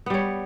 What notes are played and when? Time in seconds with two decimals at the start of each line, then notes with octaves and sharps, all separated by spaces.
0.06 B3
0.10 G3
0.14 C#5